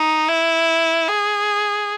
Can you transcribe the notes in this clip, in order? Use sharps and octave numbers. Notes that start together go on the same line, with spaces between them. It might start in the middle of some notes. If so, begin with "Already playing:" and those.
Already playing: D#4
E4
G#4